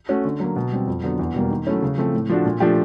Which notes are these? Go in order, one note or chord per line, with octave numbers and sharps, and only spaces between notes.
A3 C#4 F#4
D3
F#3 A#3
B2
G3 C4
F2
D3 F#3 B3 D4
E2
B2 G3 A#3
D#3
F#3 A3 C#4 E4
C#3
F3 A3 C4
A2
F3 A3 D4 F#4
A#2
F3 A3 D4 G4